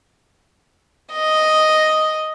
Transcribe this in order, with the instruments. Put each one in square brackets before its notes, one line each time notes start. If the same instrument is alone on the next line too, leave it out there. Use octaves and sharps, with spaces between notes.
[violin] D#5